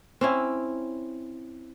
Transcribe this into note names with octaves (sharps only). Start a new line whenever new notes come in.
C4 C#4 E4